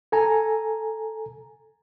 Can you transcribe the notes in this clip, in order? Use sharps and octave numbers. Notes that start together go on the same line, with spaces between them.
A4 G#5 A#5